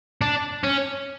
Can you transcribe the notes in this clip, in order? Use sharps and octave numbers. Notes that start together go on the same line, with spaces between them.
D4
C#4